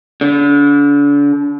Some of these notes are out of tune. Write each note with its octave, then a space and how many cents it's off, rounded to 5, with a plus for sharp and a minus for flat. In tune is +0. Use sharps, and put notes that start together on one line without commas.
D3 -35